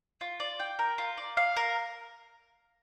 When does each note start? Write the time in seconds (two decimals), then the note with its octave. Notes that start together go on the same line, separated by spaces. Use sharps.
0.21 F4
0.40 D5
0.60 G5
0.79 A#4
0.98 F4
1.17 D5
1.37 F5
1.56 A#4